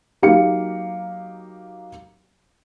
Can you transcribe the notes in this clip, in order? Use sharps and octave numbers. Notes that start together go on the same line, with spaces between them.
F#3 A#3 D#4 G4 F5 C#7